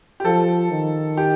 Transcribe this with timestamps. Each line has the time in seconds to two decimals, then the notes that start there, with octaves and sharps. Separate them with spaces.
0.20 G4
0.25 F3 A4
0.71 D#3
1.17 G4